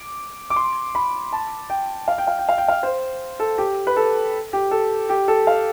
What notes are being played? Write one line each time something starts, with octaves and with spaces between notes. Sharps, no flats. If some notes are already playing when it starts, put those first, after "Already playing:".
Already playing: D6
D6
C6
B5
A5
G5
F5
G5
F5
G5
F5
G5
F5
C5
A4
G4
B4
A4
G4
A4
G4
A4
F5